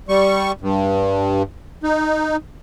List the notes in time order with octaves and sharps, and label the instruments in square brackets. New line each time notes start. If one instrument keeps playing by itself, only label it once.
[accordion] G3 C#6
G2
D#4